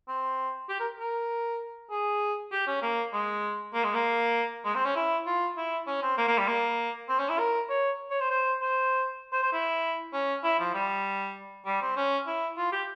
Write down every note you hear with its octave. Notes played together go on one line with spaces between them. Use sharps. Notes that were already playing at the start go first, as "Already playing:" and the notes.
C4
G4
A#4
A#4
G#4
G4
C#4
A#3
G#3
A#3
G#3
A#3
G#3
C4
C#4
E4
F4
E4
C#4
C4
A#3
A#3
G3
A#3
C4
C#4
E4
A#4
C#5
C#5
C5
C5
C5
C5
C5
E4
C#4
E4
F3
G3
G3
C4
C#4
E4
F4
G4